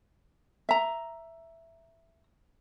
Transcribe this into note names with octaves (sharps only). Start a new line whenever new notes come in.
E5 A#5